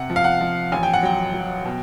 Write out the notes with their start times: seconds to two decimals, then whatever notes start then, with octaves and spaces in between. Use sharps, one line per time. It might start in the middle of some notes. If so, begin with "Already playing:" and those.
Already playing: C3 F#5
0.10 F3
0.16 F5
0.24 F#5
0.41 F3
0.72 A1 G#5
0.83 G5
0.93 F#5
1.03 F#3 G5
1.34 F#3
1.65 B2